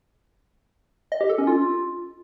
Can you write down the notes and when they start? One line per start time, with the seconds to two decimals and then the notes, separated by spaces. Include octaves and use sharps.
1.12 D#5
1.21 G4
1.30 A4
1.38 C#4
1.47 F4